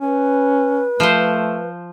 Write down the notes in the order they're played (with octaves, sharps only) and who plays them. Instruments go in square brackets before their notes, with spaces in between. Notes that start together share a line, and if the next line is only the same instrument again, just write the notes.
[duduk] C#4 [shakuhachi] B4
[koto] F3 C5 [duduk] A3